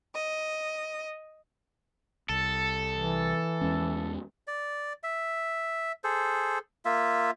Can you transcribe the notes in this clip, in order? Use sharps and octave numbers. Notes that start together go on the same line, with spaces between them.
D#5
C2 A4
E3
E2 G#3 C#4
D5
E5
G#4 A4 C5
A#3 F4 E5